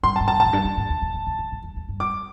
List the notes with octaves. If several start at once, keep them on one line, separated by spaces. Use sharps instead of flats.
G2 C6
A5
G2
A5
A2
A5
E2
G2
E2
G2
E2
E2
E2
E2
G2
A2
E2
E2
G2
D6